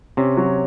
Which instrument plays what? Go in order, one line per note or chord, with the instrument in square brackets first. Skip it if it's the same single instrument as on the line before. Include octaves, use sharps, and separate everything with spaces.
[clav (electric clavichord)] C3 [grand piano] C#4
[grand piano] F#3